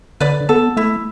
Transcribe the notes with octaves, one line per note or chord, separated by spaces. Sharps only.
D3 B4 D5
B3 A4
A3 E4